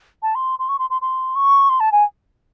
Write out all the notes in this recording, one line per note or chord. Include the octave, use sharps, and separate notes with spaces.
A5
C6
C6
C#6
C6
C6
C6
C#6
C6
A5
G#5